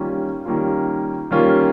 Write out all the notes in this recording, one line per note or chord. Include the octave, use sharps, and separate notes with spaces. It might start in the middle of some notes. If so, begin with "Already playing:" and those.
Already playing: D#3 G3 A#3 C#4 F4
D#3 G3 A#3 C#4 F4
D#3 G3 A#3 C#4 F4